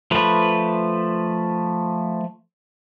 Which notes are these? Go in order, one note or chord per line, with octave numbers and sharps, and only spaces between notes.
F3 A3 B4